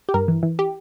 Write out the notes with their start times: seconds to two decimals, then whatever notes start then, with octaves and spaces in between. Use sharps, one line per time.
0.09 G4
0.14 G2 A#4
0.28 E3
0.43 E3
0.59 G4